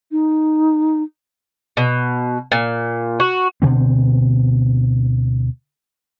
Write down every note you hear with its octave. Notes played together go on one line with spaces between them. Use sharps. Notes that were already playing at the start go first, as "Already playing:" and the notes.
D#4
B2
A#2
F#4
D2 B2 D3 C4